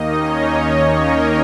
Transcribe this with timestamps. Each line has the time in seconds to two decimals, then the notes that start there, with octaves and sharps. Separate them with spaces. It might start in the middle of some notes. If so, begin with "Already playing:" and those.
Already playing: D#2 D#3 A#3 D#4 D#5
0.17 C#4 C#5
0.56 C#4 C#5
0.95 A#3 A#4